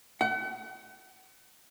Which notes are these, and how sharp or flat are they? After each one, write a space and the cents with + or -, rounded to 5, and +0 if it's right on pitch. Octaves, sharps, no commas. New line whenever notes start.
F#5 +40